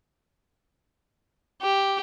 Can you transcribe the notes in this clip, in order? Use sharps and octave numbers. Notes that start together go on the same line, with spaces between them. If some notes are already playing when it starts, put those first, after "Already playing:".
G4